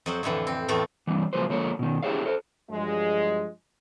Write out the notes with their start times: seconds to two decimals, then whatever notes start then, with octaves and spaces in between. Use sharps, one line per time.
0.06 F2 F#3 C5
0.23 F2 A2 D3 E3
0.47 C4
0.68 E2 A2 A3 F4
1.07 E3 G3 C4
1.33 C#3 F3 F#3 A#3 B4 C5
1.50 D3 F3 A3 A#3 C#5
1.79 B2 D#3
2.03 E4 G4 G#4 C#5 E5 F5
2.26 A4 C5
2.70 G2 F3 F#3 G#3